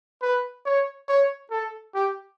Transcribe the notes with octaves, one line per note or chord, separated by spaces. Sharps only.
B4
C#5
C#5
A4
G4